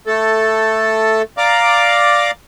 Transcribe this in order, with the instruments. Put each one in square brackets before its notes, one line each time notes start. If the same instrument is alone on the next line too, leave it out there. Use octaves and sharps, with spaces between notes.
[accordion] A3 A4
D5 F5 A#5 D6